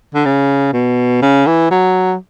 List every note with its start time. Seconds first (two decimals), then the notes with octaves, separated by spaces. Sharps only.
0.14 D3
0.25 C#3
0.73 B2
1.22 C#3
1.47 E3
1.71 F#3